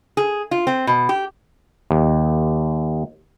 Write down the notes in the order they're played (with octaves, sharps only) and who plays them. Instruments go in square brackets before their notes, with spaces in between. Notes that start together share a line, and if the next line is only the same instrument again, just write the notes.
[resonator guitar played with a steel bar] G#4
F4
C4
B2
G4
[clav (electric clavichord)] D#2